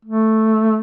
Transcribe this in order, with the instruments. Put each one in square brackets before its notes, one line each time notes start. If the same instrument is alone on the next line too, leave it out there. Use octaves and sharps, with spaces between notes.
[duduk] A3